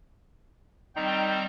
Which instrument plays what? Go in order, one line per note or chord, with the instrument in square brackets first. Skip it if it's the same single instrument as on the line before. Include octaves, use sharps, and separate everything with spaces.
[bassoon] D#3 [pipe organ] G3 C4 A#5 [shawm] G5